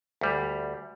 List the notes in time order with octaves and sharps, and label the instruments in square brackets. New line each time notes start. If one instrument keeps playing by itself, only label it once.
[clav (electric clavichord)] D2 G3